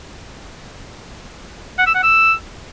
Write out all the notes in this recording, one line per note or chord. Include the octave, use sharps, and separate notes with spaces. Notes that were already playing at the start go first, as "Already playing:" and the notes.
F#5
E6
F#5
E6